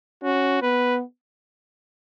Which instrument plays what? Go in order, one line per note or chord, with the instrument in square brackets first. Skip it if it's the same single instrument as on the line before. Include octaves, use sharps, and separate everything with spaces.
[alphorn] C#4 [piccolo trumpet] F#4
[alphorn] B3 [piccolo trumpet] B4